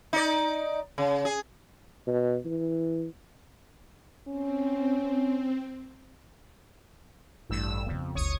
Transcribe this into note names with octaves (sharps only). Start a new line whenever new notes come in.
D#4 D5
C#3
G#4
B2
E3
C4 C#4
A1 G2 E6
F2 C#3 B3
F#1 C#2 C#5 C#6 D#6